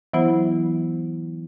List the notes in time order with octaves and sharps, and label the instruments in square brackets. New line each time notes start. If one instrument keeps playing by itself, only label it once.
[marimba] E3 F#3 B3 E4 C5